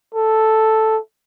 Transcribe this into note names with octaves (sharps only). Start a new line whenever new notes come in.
A4